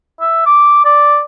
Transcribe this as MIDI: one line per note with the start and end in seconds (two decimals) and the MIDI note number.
0.21 0.42 76
0.46 0.81 86
0.85 1.21 74